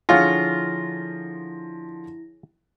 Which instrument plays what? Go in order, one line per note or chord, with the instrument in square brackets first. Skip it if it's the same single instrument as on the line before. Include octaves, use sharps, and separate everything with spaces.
[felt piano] D3 F3 [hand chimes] E4 A#6 [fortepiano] F4 [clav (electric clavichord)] G#4 C#5 F#5